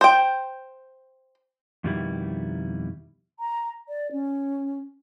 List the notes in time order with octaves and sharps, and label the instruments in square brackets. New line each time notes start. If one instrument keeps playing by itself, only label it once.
[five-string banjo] C5 G5
[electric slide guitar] F2 B2 D#3 G3 B3 E4
[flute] A#5
D5
C#4